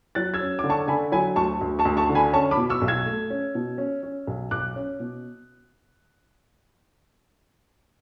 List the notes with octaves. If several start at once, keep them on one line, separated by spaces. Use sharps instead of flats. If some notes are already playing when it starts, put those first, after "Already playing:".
F#3 F#6 A6
E6 G#6
C#4
D3 D6
A5 C#6
D3 G#5 B5
F#3 G#5 B5
D2 A5 C#6
D2
A5 C#6
D2
A5 C#6
D3
G#5 B5
C#4 A5 C#6
B5 D6
B2
C#6 E6
B1
E6 G#6
A3
C#4
B2
C#4
C#4
B1
B1 D6 F#6
C#4
B2